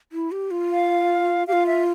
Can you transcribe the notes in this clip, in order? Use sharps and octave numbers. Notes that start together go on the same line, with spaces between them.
E4
G4
F4
F5
G4 F5
F4
E5